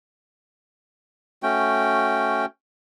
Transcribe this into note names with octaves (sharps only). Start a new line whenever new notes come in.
A3 C#4 F#4 G5